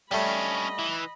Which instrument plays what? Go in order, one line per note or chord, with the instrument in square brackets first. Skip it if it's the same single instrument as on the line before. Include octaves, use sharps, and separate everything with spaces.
[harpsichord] G3 A3 [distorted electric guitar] C#4 D4 [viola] D#5 B5
[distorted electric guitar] E3